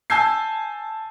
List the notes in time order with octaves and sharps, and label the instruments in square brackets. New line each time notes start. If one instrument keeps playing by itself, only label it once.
[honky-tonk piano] G#5 A5 E6 G6 G#6 C7